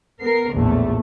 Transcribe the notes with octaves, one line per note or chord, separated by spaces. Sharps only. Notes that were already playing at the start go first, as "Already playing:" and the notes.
B3 A#4 C7
A#1 E2 A2 A3